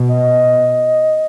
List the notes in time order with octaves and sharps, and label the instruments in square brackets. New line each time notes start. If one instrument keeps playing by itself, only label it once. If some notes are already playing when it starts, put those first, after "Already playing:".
Already playing: [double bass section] B2
[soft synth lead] D#5